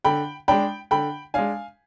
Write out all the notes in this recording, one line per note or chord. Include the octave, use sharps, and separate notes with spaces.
D3 G5 B5
G#3 D4 G5 B5
D3 G5 B5
G#3 D4 F5 G#5